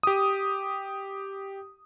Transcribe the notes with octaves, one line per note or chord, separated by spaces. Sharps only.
G4 D#6